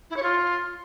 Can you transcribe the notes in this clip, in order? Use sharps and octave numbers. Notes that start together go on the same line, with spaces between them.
E4
C#5
F4